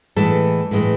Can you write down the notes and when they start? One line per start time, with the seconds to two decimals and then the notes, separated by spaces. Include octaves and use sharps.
0.16 A2 E3 G#3 A4
0.71 A2 E3 G#3